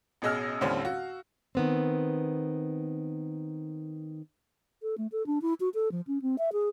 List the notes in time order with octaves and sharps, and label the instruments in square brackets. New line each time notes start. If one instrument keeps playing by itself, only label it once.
[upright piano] A1 B2 G#4 D#5 E6 F6
D#2 A2 D3 G3 C4 C#4
F#4 F5
[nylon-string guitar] D#3 B3 C4
[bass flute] A4
A3
A4
D4
E4
F#4
A4
F3
C#4
C4
E5
G#4